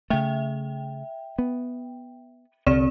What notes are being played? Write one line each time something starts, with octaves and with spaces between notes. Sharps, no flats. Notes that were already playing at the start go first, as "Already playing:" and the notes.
C#3 A3 E5 G5
B3
C2 D3 C4 D5 E7